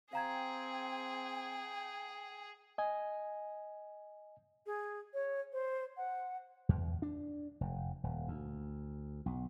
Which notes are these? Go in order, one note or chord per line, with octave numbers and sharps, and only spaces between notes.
C4 G#4 F5 G5 A#5 G#6
D#5 G#5
G#4
C#5
C5
F#5
E2
D4
F1
D#1
D2
B1